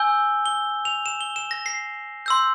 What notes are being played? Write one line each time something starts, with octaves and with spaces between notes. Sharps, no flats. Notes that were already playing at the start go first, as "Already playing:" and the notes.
Already playing: G#5 E6 G6 G7
G7
F7
E7
G7
E7
A#6
C7
C6 E6 G6